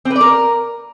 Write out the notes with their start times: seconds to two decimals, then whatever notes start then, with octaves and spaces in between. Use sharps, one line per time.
0.05 C4
0.10 B4
0.16 D5
0.21 A#4